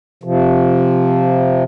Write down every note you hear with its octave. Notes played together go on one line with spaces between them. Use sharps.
C3 F3